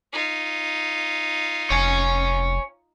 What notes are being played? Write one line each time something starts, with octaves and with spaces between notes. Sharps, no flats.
D#4 F4
F1 C#5 G#5